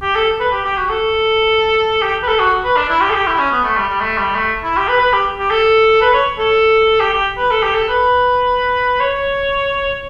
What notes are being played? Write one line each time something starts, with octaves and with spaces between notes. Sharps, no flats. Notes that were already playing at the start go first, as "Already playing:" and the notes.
G4
A4
B4
G4
G4
F#4
A4
G4
B4
A4
F#4
B4
D4
E4
G4
A4
G4
E4
C#4
B3
A3
G3
G3
A3
G3
A3
E4
G4
B4
B4
G4
G4
A4
B4
C#5
A4
G4
G4
B4
A4
G4
A4
B4
C#5